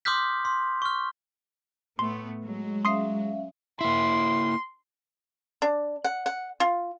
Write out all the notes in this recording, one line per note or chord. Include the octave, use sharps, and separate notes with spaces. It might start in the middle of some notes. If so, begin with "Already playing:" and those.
C6 D6 D#6 F6 G6 B6
C6
C#6 F6
A2 A3 B3 C6
F#3 G#3
C#4 E5 F5 C6 D#6 C7
A#3 E4 C6
D4
F#5
F#5
F4